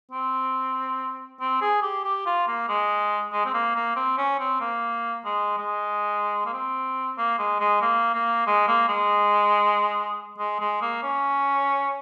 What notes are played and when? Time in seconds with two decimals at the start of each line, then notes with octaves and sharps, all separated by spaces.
0.12 C4
1.40 C4
1.61 G#4
1.82 G4
2.04 G4
2.26 F4
2.47 A#3
2.68 G#3
3.32 G#3
3.45 C4
3.54 A#3
3.75 A#3
3.96 C4
4.18 C#4
4.40 C4
4.61 A#3
5.25 G#3
5.58 G#3
6.46 A#3
6.53 C4
7.18 A#3
7.39 G#3
7.60 G#3
7.82 A#3
8.14 A#3
8.47 G#3
8.67 A#3
8.88 G#3
10.38 G#3
10.60 G#3
10.82 A#3
11.03 C#4